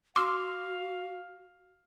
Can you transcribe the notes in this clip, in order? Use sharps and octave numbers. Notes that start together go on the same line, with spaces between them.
F#4 F5 C6 D6 E6 F6